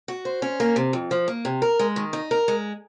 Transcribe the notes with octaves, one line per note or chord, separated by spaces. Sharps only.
F#4
C5
C#4
A#3
C3
F2
F3
A#3
C3
A#4
G#3
D#3
D#4
A#4
G#3